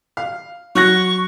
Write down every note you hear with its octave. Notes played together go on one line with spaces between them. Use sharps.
F5
F#3 C#6 F#6 A#6